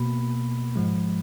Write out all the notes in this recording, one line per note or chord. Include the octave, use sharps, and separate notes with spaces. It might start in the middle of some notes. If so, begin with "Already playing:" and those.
Already playing: B2 A#3 B5
G#2 F3 G#3